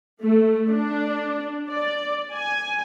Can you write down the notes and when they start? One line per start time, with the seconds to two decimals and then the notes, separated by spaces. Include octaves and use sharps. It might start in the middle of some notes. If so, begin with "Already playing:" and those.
0.22 A3
0.70 D4
1.71 D5
2.34 G#5